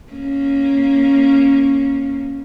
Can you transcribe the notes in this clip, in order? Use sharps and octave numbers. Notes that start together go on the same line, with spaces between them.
A#3 C#4